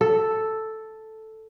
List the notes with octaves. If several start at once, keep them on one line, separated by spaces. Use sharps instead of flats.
A4